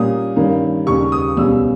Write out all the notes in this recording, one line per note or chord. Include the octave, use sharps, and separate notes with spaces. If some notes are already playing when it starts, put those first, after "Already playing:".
Already playing: A#2 G3 A#3 C#4 D#6
G2 D#3 A#3 C#4
D#2 C#3 G3 C#6
D#6
C#2 B2 G3 C#4 E6